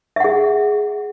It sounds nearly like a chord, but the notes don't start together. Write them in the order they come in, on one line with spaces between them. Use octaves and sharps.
E5 F#5 G#4